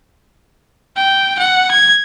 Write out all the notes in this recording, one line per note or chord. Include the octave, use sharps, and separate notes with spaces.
G5
F#5
G#6